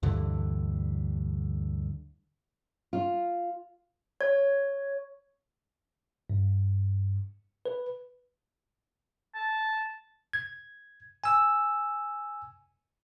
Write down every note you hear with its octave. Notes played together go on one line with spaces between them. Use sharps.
D2 G2 D3 E3
F4
C#5
G2
B4
A5
G#6
G#5 E6